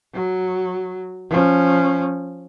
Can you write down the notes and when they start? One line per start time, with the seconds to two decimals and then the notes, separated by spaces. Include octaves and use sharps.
0.13 F#3
1.30 F3 C#4